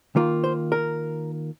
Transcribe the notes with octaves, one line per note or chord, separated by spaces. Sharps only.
D#3 A#3 F4
C5
A#4